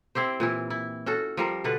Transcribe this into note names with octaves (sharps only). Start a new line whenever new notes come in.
C4 E4 G4 C5
A#2 E3 E4
E4
C#4 F#4 A4
F3 G3 A#4
B2 D3 D4 B4